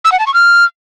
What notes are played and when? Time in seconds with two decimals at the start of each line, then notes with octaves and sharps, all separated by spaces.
0.05 E6
0.12 F#5
0.19 A5
0.27 C#6
0.34 F6